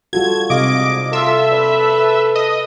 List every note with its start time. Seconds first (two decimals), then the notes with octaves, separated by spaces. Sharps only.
0.13 G3 F4 F#4 A4 G#6
0.50 G#2 C3 G3 D#5 F5 D6
1.13 F4 A4 E5
1.52 B4 D5
2.35 D#5